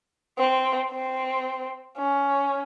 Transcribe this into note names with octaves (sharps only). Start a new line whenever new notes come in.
C4
C4
C#4